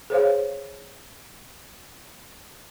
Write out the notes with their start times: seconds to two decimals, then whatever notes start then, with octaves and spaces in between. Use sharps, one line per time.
0.10 G#4 C5 C#5 F5